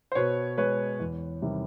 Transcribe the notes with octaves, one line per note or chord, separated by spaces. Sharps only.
C5
B2 B4 C#5
G#3 B4 C#5
E2
C3 D#3 G3